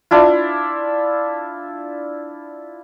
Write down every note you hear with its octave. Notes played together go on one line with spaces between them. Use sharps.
D4 E4 F4